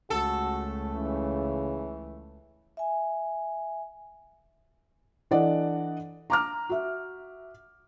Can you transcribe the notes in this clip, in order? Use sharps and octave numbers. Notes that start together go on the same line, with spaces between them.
C#2 A3 F#4 A4
C#3 E3
E5 G#5
E3 D4 A4 D5 D#5 F#5
A#5 D6 F6
F#4 E5